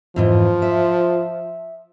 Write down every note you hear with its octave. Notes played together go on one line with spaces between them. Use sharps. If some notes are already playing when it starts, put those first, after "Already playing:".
F2 G#2 E3 F3
E5